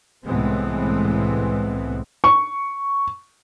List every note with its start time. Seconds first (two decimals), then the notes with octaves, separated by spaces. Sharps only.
0.25 C2 A2 E3 G#3 B3 C4
2.24 C#6